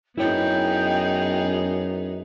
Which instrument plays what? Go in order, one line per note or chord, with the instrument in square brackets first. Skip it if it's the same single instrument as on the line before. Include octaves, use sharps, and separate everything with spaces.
[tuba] F#2 [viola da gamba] B3 D#4 G#4 [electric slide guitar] E4 C#5 [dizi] G5